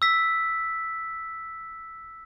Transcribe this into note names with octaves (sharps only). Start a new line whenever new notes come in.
E6 B6